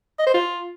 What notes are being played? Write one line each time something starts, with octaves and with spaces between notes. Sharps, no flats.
D#5
C5
F4